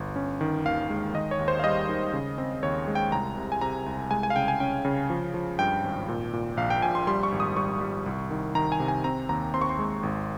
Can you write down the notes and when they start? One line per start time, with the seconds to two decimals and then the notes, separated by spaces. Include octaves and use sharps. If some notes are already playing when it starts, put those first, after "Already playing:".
Already playing: G1
0.16 C#4
0.41 D#3
0.66 D#2 F5
0.90 G#3
1.14 D#3 D#5
1.31 C#5
1.39 D#2
1.48 C5
1.59 F5
1.64 G3 D#5
1.89 D#3
2.13 C#3
2.38 C4
2.63 D#2 C#5
2.87 G#3
2.95 G5
3.12 C2 A#5
3.37 C3
3.52 G#5
3.61 C3 A#5
3.86 C2
4.11 G#3 G#5
4.23 G#5
4.30 F5
4.36 C#3 G5
4.48 G#5
4.60 C#4 G5
4.85 C#3
5.10 F3
5.34 F3
5.59 G2 G5
5.83 G#1
6.09 A#2
6.33 A#2
6.57 A#1 F5
6.70 G5
6.82 A#1 G#5
6.95 C6
7.07 G3 C6
7.23 C#6
7.32 G#1
7.40 D#6
7.57 G3 C#6
7.81 G3
8.06 C2
8.31 D#3
8.55 D#3 A#5
8.72 G#5
8.80 C3
8.88 G#5
9.04 C4 A#5
9.29 D#2 A#5
9.54 C4 C6
9.61 C#6
9.69 C6
9.79 G#3
10.03 G#1